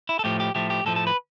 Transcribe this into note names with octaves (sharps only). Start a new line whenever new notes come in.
E4
A4
A2 F3 A3 G4
G4
A2 F3 A3 G4
G4
A2 F3 A3 A4
A4
B4